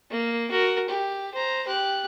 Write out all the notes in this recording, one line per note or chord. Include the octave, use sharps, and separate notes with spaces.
A#3
F#4 A#4
G4
C5 A#5
G4 F#6